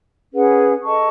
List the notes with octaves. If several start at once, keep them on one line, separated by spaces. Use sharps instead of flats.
C#4 G#4 B4 F#5
A4 D#5 A5 C#6